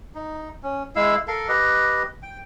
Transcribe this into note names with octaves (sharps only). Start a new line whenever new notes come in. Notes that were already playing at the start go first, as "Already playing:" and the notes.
D#4
C#4
G#3 E4 F5 E6
A4 A#4 F5
G4 B4 D#5
G5